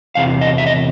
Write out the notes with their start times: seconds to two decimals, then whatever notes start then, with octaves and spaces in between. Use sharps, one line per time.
0.15 E2 C3 E3 F5
0.41 D#5
0.58 E5
0.67 D#5